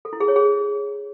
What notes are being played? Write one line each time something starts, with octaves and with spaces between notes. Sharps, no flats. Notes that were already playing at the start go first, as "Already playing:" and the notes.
A4
E4
G#4
C#5
G#4